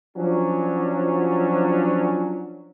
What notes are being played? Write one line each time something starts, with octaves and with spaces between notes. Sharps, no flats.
F3 F#3 C#4 D4